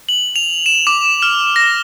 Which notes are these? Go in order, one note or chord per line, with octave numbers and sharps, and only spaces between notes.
F#7
F7
E7
D6
F6
A#6